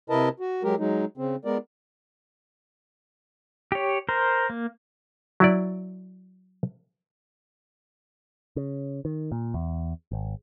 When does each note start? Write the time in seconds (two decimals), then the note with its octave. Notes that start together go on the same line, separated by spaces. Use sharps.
0.10 C3 E4 A#4 B4 D#5 A5
0.40 F#4
0.63 F#3 G#3 G4 A#4
0.79 F#3 G#3 D#4
1.18 C#3 C4
1.45 G#3 B3 A#4 D5
3.72 G4 C#5
4.09 A#4 C5
4.50 A#3
5.40 F#3 E4 D5
8.56 C#3
9.05 D#3
9.32 A#2
9.54 E2
10.12 G#1